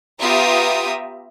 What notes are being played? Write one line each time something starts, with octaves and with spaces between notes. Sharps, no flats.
B3 F4 G4 E5 A#5 D#6